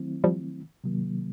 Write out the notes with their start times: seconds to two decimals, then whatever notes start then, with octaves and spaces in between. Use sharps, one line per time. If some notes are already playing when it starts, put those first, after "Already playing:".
Already playing: D#3 F#3 A3 C4 E4
0.24 F3 G3
0.84 C3 D#3 F#3 A#3